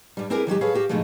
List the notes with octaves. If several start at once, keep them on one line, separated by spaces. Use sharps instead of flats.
G2 G3
C4 E4 G4 G#4 A#4 B4
D#3 F#3 G#3 G4
G#4 A4 B4 C#5 F5
F#4 G4 F5
G#2 B2 D3 F3 G#3 A3